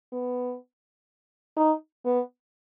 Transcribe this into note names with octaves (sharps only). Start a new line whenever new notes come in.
B3
D#4
B3